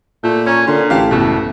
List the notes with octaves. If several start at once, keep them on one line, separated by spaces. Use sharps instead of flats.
A#2 A3 G6
C#4 A#5 C#6
A#2 D3 C#4 C6
A1 G4 F5 A5
F#1 B2 A3